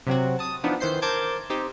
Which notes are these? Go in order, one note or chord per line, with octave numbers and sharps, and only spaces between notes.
C3 F#3 C4 F#4
A5 D#6
E3 F3 B3 D4 D#4
D#3 E3 C5 G6 C7
A#4 C5 A5 D6 G6 G#6
C4 D#4 G4